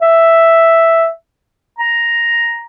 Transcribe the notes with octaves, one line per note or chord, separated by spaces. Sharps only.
E5
A#5